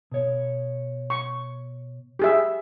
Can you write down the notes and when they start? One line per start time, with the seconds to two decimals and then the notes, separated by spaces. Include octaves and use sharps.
0.12 B2 C#5
1.10 C#6
2.19 G4 G#4 E5